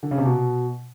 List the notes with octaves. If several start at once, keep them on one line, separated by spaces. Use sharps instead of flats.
D3
C#3
C3
B2